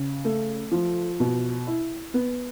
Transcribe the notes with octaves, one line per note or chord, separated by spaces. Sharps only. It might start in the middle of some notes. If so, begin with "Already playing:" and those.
Already playing: C#3
A3
F3
B2
E4
B3